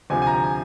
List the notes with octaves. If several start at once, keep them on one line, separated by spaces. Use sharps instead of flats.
D2 C3 F3 G#5
G#5
A#5
G#5